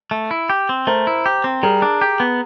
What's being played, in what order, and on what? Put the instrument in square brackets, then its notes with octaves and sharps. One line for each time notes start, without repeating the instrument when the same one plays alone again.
[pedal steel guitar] A3
E4
G4
C4
[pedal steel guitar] A3 [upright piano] A#4 C5
[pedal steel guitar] E4
G4
C4
[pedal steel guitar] G3 [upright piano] G#4 A#4
[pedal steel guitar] D4
G4
B3